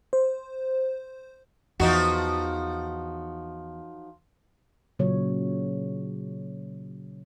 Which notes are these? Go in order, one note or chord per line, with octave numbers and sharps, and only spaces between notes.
C5
E2 F3 D#4 F#4
A#2 C#3 F#3 C#5